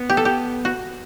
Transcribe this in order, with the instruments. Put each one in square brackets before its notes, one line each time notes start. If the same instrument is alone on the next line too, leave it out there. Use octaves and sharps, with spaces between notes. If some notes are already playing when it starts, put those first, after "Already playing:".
Already playing: [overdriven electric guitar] B3
[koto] G4
A4
G4
F#4